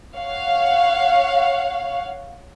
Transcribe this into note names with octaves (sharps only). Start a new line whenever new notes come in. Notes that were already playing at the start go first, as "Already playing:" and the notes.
C#5 F5 F#5